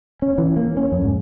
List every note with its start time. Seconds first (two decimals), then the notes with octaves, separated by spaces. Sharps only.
0.22 C#4
0.38 E3
0.57 A#3
0.77 C#4
0.92 F2
1.05 G#2